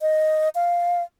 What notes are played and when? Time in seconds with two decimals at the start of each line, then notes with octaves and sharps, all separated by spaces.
0.01 D#5
0.55 F5